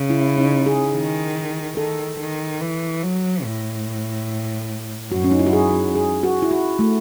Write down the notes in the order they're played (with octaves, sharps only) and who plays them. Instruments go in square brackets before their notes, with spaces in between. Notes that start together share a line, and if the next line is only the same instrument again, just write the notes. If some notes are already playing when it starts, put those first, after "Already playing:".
Already playing: [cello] C#3
[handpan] E4
D#4
G#4
[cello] D#3
[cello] D#3 [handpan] A4
[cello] D#3
E3
F#3
A2
[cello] F#2 [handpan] F#4
[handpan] C#4
D#4
E4
F#4
G#4
G#4
F#4
E4
F#4
A3